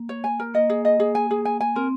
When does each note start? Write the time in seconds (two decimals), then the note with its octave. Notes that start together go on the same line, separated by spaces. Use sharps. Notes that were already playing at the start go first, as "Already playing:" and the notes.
Already playing: A#3
0.09 C#5
0.24 G#5
0.40 A#4
0.54 A#3 D#5
0.70 G#4
0.85 D#5
1.00 G#4
1.15 G#5
1.31 G#4
1.45 G#5
1.60 G#5
1.76 C4 A#4